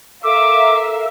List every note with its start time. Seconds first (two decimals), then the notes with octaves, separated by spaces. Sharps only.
0.24 A4 A#4 E5 F5 D6